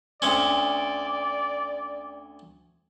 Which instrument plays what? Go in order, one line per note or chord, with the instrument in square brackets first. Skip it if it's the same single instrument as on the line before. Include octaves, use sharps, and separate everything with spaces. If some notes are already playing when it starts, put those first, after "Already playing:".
[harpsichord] D2 C4 C#4 [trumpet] D5